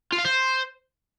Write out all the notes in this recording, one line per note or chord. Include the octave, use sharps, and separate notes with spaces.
F4
F5
C5